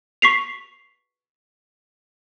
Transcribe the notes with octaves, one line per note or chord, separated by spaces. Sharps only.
C#6 B6 C7 F7